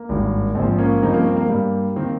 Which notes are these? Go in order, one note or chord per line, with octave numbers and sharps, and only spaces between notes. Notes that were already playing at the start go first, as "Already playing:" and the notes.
Already playing: A#3
G#1 G2 D#3
A#1 G#2 F3 C4
A#3 C#4
G2 F3 A#3 C4 D#4
A#3 C#4
C4
A#3
G2 G3 A#3
D#3 A#3 C4